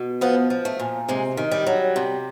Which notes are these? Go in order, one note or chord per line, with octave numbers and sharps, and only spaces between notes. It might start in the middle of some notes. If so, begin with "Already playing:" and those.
Already playing: B2
F3 B3
F3
A3
A#2
C3 G#3
D#3
G3
F#3
C3